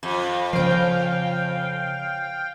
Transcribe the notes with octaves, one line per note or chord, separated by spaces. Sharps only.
F2
C#3 F3 C#4 C5 F5 G5